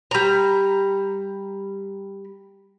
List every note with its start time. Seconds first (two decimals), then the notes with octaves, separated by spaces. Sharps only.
0.11 G3 A#5